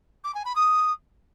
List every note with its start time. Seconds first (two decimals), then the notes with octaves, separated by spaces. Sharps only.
0.24 D6
0.34 G#5
0.45 B5
0.55 D#6